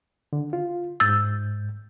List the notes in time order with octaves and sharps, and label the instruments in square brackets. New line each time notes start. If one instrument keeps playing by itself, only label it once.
[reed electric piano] D3
F4
[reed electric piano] G#2 G6 [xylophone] E6 A6